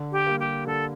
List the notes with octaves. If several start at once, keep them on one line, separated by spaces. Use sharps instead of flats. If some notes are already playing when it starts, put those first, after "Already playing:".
Already playing: D3
G4
G3 A#3
G4
D3 A4